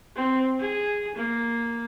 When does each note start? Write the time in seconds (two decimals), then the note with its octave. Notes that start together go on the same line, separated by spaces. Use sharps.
0.16 C4
0.60 G#4
1.16 A#3